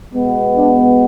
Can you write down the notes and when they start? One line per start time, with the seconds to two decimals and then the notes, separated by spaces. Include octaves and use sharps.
0.13 B2 G#3 B3
0.57 D4